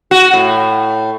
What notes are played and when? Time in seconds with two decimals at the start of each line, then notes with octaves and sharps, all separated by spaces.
0.11 F#4
0.33 A2